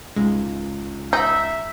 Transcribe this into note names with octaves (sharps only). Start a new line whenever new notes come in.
C#2 G#2 G#3
D#4 E5 G5 B5